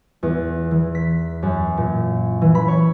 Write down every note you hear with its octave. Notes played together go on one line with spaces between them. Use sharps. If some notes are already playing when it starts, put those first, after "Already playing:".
E2
E3
B6
F#2
A#2
E3
B5
C#5